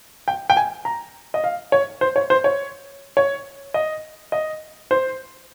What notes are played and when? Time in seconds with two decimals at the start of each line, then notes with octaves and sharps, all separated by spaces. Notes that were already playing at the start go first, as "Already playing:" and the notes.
0.28 G5
0.50 G5
0.57 G#5
0.85 A#5
1.34 D#5
1.44 F5
1.72 C#5
2.01 C5
2.16 C#5
2.30 C5
2.44 C#5
3.17 C#5
3.74 D#5
4.32 D#5
4.91 C5